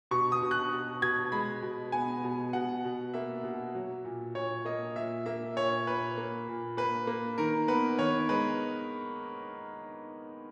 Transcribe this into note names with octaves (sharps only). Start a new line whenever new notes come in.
B2 C#6
D#6
B2
F#6
B2
B2 G#6
G#3 B5
B2
B3 G#5
B2
B2 F#5
B2
A#3 E5
B2
F#3
A#2
A#2 C#5
A#3 D#5
A#2 E5
A#3 E5
A#2 C#5
A#2 B4
A#3
A#2
A#3 B4
A#3
D#3 A#4
B3 B4
D#3 C#5
G#3 B4